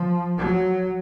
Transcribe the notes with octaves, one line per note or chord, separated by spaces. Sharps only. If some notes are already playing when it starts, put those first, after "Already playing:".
Already playing: F3
F#3